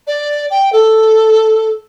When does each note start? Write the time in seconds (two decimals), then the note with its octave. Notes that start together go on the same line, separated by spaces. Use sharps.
0.07 D5
0.51 G5
0.73 A4